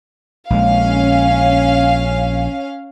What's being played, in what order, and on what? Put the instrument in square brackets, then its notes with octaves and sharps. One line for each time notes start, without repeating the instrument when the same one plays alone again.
[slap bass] A#1 G#3 [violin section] C#4 F5